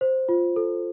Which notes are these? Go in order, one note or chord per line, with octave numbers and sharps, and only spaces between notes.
C5
F4
A4